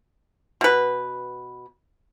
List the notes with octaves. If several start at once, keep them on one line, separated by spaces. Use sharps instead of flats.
B2 B4